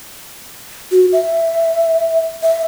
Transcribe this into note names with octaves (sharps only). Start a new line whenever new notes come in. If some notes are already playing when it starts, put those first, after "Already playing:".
F#4
E5
E5